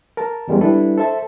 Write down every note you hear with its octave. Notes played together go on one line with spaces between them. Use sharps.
A#4 A5
F2 E3 G3 G#3 B3 C#4
G3 D4 E4 A4 B4
A4 C5 E5 A5